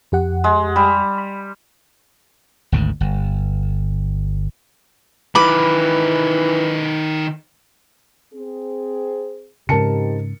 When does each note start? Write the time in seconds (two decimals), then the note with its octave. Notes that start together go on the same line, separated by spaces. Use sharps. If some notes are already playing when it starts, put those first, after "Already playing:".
0.12 F2 G4 F#5
0.44 G#3
0.76 G3
1.18 B5
2.72 G#1 D2 G#2
3.01 G1
5.35 D#3 E3 B4 B5 D6
8.34 C4 G#4
9.69 G#2 C#3 C4 D#4 G4 A#4 A5 C#7